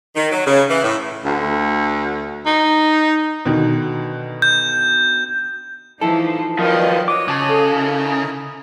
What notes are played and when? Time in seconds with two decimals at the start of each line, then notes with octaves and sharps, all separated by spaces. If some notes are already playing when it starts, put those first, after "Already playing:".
0.16 D#3
0.31 F#3
0.46 C#3
0.69 E3
0.83 A2
1.25 D2
2.46 D#4
3.46 B2 D3 D#3
4.42 G6
6.01 E3 F3 D#4 E4 A4
6.59 D#3 F3 F#3 B4 D5 D#5
7.08 F#4 C#5 D#5 D6
7.28 C#3 A5 D6
7.49 A4
7.74 D#4 E4 A#4